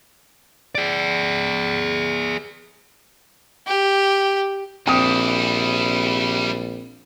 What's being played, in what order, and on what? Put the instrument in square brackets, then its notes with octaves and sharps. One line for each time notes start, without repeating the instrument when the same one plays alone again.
[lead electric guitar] G#4 D5
[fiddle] G4
[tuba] A#1 [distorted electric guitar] G3 E4 [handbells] C4 [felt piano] G5 D#6